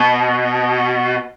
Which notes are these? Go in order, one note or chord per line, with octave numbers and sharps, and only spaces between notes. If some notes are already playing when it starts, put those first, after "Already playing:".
Already playing: B2